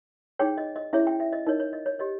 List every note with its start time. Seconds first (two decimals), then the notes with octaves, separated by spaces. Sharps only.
0.39 D#4 G#4 C#5 G5
0.58 D#5
0.76 D#5
0.93 C#4 E4 G#4 C#5 E5
1.07 G5
1.20 E5
1.33 D#5
1.47 D#4 A#4 C#5 D#5
1.60 C#5
1.73 D#5
1.86 C#5
1.99 G4 C#5 D#5